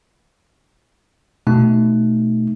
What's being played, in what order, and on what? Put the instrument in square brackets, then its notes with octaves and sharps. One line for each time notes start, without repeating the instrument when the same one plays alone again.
[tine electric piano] B2 A3 D#4